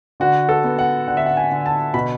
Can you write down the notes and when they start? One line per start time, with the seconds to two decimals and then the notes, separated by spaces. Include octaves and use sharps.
0.20 D3 F#4
0.49 A4
0.64 B3
0.79 F#5
1.08 D3 F#5
1.17 E5
1.26 F#5
1.37 G#5
1.51 D3
1.66 A5
1.94 B2 B5